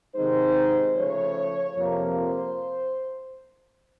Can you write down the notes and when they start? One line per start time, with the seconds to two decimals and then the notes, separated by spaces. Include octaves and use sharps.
0.16 C3 D#3 G#3 C4 D#4 C5
0.95 C#3 F3 A3 C#5
1.75 F2 C3 F3 A#3
2.15 C5